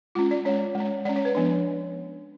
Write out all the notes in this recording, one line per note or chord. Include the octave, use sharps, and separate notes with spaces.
G#3 C#4 F4
D5
G#3 C#4 C#5
G#3
C#4
G#3 C#4 D5
C#5
B4
F3 B3 D4